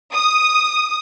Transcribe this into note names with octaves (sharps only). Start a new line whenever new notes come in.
D#6